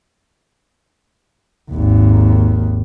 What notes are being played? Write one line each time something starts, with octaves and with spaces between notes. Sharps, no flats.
G#1 D#2